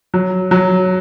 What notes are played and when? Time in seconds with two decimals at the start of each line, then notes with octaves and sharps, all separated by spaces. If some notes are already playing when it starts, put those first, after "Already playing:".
0.14 F#3
0.51 F#3